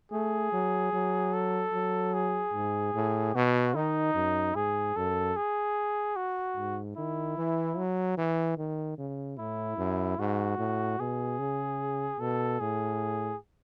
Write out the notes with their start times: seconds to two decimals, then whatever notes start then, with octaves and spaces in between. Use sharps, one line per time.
0.12 A3 G#4
0.53 F#3
0.93 F#3
1.33 A4
1.73 F#3
2.14 G#4
2.54 G#2
2.95 A2
3.35 B2 F#4
3.75 D#3 D#4
4.15 F#2
4.55 G#2 G#4
4.96 F#2 A4
5.36 G#4
6.16 F#4
6.57 G#2
6.97 D#3 E4
7.38 E3
7.77 F#3
8.18 E3
8.58 D#3
8.98 C#3
9.38 A2 E4
9.78 F#2
10.19 G#2 F#4
10.58 A2
10.99 B2 G#4
11.39 C#3
12.20 B2 A4
12.60 A2 G#4